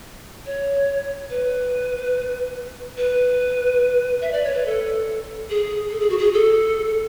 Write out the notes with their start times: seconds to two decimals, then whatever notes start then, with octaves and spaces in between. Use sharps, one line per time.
0.46 C#5
1.30 B4
2.98 B4
4.21 E5
4.32 D5
4.44 C#5
4.54 B4
4.66 A4
5.50 G#4
5.91 A4
6.00 G#4
6.10 F#4
6.18 G#4
6.34 A4